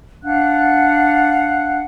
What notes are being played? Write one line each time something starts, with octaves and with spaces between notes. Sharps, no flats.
D4 F5 F#5 F#6